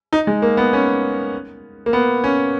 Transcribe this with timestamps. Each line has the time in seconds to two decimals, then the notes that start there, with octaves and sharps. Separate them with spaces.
0.13 D#4
0.27 G#3
0.42 A#3
0.57 B3
0.73 C#4
1.86 A#3
1.93 B3
2.24 C#4